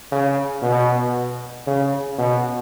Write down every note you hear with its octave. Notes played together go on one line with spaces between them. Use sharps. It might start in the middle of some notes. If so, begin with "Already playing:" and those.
C#3
B2
C#3
B2